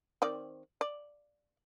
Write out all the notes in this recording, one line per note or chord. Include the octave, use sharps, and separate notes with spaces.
D#3 C4 D5
D5